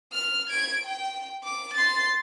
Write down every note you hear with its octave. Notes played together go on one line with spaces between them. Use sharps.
F6
G#6 D7
G5
D6
C6 A6